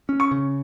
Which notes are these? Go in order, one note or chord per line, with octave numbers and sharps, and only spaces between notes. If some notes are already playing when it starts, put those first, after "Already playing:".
C#4
C#6
C#3